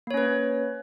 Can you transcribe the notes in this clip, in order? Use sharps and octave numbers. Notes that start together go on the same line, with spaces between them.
A#3 C#4 B4 C#5